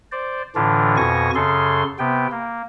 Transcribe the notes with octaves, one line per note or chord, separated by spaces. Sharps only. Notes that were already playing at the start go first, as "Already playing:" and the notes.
C5 D5
A2 D3 E3 D4 F4
F2 B2 G#5 C#6 A#6
F#2 C#3 G#4 A4 C6
C3 B3 G5
A#3